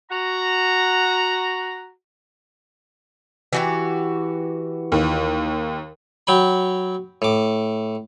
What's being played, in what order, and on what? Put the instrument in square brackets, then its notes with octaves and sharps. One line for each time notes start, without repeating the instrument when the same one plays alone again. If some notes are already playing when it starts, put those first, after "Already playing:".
[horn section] F#4 A#5
[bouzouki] E3 F#4 G4
[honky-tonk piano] D#2
[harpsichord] F#3 G5 B5
A2 D6